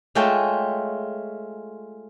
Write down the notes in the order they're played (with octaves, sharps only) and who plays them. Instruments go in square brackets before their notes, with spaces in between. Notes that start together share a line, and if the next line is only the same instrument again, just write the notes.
[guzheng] G#3 A3 F4 C#5 G5 A5